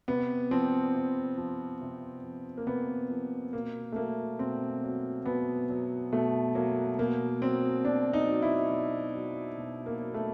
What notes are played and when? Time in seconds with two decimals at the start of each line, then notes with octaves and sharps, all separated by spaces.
0.08 C3 B3
0.51 F3 C4
0.95 C3
1.37 F3
1.81 C3
2.24 F3
2.57 A#3
2.67 C3 B3
3.10 F3
3.53 B2 A#3
3.92 A3
3.96 F#3 A#3
4.39 B2 C4
4.84 F#3
5.25 B2 B3
5.70 F#3
6.13 B2 A3
6.55 F#3 A#3
6.99 B2 A#3
7.42 F#3 C4
7.85 B2 D4
8.13 D#4
8.29 F#3
8.42 E4
8.71 B2
9.15 F#3
9.57 B2
9.86 A#3
10.00 F#3
10.14 A3